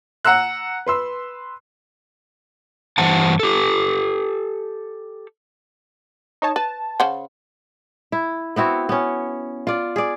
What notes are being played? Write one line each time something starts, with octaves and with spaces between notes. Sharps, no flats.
F#5 A#5 E6 F#6
B4 C6 E6
G2 E3 C5 F#5 A5
G4 A4
D#4 C#5 A5
B4 A5
C#3 C5 F#5
E4
B3 C4 E4 F#4
B3 C#4
F4 D5
G#4 D5